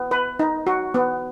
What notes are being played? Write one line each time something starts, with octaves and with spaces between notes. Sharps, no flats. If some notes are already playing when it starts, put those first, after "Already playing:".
Already playing: B3
B4
D#4
F#4
B3